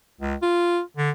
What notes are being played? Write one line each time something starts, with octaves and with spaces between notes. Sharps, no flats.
C#2
F4
D3